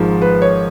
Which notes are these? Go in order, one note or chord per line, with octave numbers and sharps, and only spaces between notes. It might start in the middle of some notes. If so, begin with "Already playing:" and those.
Already playing: G#1 G#2 F3 G#3
B4
C#5